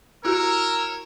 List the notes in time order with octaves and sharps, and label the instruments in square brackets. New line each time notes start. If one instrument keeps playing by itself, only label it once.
[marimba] E4 F#4 G4 [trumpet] A#4 [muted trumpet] C#5 [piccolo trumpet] E6